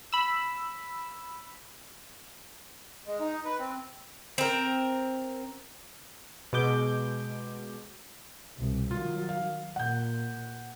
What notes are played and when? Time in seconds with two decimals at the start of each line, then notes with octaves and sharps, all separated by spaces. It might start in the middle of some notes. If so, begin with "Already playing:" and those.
0.13 B5 E6
3.07 G#3
3.21 D#4
3.45 B4
3.59 C4
4.38 C4 A#4
6.53 B2 G#3 D6 G6
8.57 C2 B2
8.91 D#3 F#3 F4
9.29 F5
9.76 A#2 F#5 G6